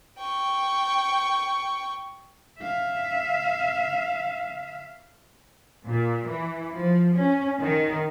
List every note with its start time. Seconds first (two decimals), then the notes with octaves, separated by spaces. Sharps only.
0.19 G5 C#6
2.59 E5 F5
5.87 A#2
6.27 E3
6.75 F3
7.17 C#4
7.61 D#3